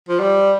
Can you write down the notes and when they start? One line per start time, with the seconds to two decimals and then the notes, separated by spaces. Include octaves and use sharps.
0.09 F3
0.20 G3